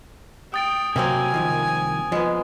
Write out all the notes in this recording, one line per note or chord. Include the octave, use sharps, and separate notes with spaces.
G5 D#6 A6 D7
C3 F#3 A#3 C4 A#4 G#5
C2 D#3 F3
F3 G#3 B3